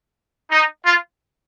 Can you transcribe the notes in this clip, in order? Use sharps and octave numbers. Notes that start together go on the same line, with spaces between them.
D#4
F4